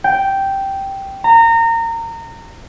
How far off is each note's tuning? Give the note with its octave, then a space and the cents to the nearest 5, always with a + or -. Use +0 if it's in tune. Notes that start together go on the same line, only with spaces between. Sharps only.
G5 -5
A#5 -25